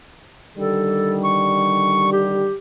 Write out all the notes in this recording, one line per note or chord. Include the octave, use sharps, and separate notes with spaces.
D3 D#3 G3 A4
C#6
G4